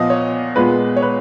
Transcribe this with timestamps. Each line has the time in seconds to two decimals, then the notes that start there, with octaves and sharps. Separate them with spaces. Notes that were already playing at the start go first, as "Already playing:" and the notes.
Already playing: A#2 F3 B3 D#5 F5
0.10 C#5
0.56 A#2 G#3 B3 B4
0.96 C#5
1.02 B4